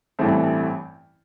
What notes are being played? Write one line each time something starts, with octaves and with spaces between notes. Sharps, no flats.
A1 G2 E3 A3 C4